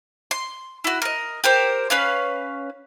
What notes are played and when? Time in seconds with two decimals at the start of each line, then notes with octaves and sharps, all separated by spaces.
0.31 C6
0.84 E4 F#4
1.02 A#4 D#5
1.44 G4 A#4 C5
1.90 C#4 B4 F5